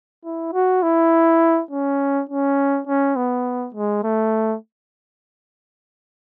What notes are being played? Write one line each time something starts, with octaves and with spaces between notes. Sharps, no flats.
E4
F#4
E4
C#4
C#4
C#4
B3
G#3
A3